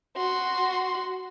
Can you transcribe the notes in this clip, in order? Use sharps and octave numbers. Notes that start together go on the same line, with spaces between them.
F#4 C6